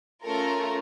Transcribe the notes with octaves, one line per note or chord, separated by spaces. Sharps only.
A3 C#4 F4 A4 A#4 A#5